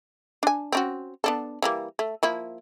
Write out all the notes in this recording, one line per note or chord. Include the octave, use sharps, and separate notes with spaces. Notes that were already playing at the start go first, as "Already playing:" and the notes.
D4 G#5
C4 C#4 F#4
B3 D4 A4
E3 G3 A#3
A3
F3 A#3 E4